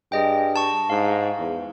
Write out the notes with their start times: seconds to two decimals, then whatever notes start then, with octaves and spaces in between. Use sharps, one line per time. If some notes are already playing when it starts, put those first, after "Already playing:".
0.12 G2 G#4 D#5 G5
0.56 A5 C#6
0.90 G#2 F5
1.38 E2